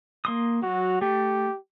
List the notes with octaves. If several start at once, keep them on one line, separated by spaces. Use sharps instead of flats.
A#3 C6 D#6
F#3 F#4
A3 G4